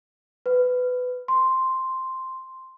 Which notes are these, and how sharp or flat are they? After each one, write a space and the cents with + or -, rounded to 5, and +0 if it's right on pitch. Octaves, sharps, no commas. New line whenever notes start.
B4 +20
C6 +0